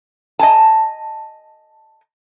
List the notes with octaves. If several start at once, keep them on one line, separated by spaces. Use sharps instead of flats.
D#5 G#5 A5